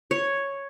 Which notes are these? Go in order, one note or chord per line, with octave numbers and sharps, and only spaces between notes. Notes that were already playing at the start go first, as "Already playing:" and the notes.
C#5